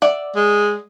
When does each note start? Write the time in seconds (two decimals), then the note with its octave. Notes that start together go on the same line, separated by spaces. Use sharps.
0.02 D5 E5 F#5
0.35 G#3